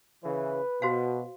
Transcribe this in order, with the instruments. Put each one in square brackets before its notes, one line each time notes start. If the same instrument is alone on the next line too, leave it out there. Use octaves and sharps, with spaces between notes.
[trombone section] C#3 E3 [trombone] B4
[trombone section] B2 [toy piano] F#4 C5 F5